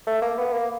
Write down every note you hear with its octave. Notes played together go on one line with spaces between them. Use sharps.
A3
A#3
B3
A#3